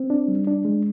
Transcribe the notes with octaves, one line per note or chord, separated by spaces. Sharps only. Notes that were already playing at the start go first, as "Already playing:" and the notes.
Already playing: C4
D4
G3
D4
G#3